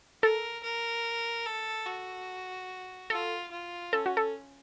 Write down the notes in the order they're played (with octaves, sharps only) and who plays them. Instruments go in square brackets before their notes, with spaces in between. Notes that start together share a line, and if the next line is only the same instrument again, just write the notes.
[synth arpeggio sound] A4 [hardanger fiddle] A#4
[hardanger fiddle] A#4
A4
F#4
[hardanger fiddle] F4 [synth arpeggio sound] A4
[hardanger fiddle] F4
[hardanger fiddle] C#4 [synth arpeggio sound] A4
[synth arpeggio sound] F#4
A4